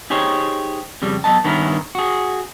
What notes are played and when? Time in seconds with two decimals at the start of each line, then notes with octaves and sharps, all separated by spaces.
0.10 D#4 G4 G#4 C5 C#5
1.02 F2 C#3 G3
1.24 F#3 B3 D#5 A5
1.44 G2 D#3 B3 C#4 E4 A#4
1.95 F#4 G#4